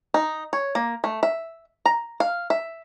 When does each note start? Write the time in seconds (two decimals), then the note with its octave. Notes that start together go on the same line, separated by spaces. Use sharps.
0.14 D#4
0.53 C#5
0.75 A#3
1.04 A3
1.23 E5
1.86 A#5
2.20 F5
2.50 E5